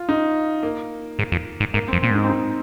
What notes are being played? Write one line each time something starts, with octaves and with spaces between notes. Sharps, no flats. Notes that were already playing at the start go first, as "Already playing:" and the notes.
Already playing: F4
D#4
A#3
G#2
F2
G#2
G#2 A#3
C4
F2
A#2 C4
G#2 D#4
C4
D#4